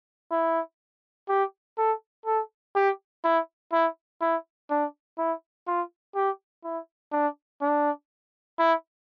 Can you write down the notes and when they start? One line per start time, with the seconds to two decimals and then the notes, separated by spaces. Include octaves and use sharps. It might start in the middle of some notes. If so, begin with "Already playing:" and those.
0.31 E4
1.29 G4
1.78 A4
2.26 A4
2.75 G4
3.24 E4
3.73 E4
4.21 E4
4.70 D4
5.18 E4
5.67 F4
6.15 G4
6.64 E4
7.12 D4
7.61 D4
8.59 E4